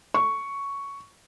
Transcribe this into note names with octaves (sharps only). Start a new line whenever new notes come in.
C#6